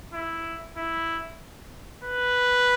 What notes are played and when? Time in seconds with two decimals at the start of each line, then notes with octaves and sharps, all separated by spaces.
0.13 E4
0.77 E4
2.04 B4